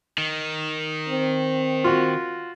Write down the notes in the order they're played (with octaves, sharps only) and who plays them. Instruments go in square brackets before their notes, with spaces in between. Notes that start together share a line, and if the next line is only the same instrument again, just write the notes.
[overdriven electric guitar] D#3
[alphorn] C4
[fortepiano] F4 F#4